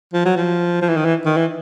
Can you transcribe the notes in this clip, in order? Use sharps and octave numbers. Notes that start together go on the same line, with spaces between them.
F3
F#3
F3
F3
E3
D#3
E3
D#3
E3